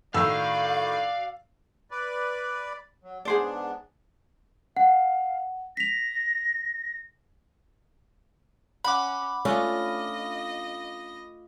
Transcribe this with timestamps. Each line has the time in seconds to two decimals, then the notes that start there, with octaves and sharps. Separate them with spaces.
0.14 A2 D#3 F#4 D5 F5 E6
1.91 B4 D5
3.04 F#3
3.25 G#2 B3 D4 G#4 C5 D5
4.77 F5 F#5
5.77 A#6 B6 F7
8.84 C#4 F#5 B5 D6
9.45 A3 C#4 D4 F4 D#5